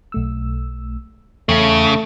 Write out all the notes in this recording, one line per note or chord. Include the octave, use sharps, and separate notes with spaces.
B1 A3 E6
E2 C#3 A3 G5 C#7